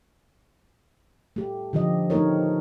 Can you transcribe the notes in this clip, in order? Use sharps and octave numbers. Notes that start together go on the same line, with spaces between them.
A3 G4
D3 F3 G4 D#5
A3 C4 D#4 A#4 C#5